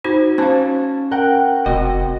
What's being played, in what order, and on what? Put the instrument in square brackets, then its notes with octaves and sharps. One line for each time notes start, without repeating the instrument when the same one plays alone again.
[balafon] D#4 F#4 C5
[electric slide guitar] C#4 A5 [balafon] C5 F5
[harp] A#4 F#5 G5
[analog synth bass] F1 [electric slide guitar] C4 D#5 [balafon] F#4